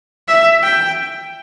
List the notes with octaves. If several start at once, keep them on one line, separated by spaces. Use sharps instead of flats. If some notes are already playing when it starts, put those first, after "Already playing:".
E5
G5